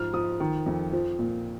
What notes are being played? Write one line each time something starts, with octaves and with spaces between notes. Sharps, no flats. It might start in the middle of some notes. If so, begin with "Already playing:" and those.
Already playing: G#2 F3 F6
F3 D#6
D#3
F2
F3
A#2